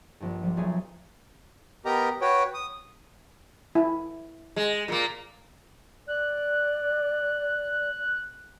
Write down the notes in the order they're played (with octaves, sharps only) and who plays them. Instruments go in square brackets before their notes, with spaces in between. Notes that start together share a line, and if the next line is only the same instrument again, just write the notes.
[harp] A#1 G2
F3 G3
B1 A3 G#4
[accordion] B3 G4 A#4 D#5 A#5
F#4 B4 C#5 G5
D#6
[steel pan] E4
[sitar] G#3
A#2 A#3
[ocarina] D5 [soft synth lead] F#6